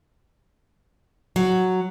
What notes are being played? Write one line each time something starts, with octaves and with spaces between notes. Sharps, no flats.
F#3